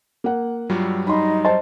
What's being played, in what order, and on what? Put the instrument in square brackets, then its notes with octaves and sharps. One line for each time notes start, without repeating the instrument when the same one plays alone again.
[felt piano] A#3 F#5
[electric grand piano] G2 F#3 G3 [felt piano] F4
[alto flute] D#4 [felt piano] B5 C6
[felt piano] C5 A5 C6 [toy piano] D#5